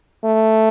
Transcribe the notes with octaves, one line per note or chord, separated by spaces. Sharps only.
A3